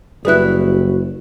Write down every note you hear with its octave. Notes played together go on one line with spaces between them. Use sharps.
F#1 G3 E4 F#4 G#4 B4 F#6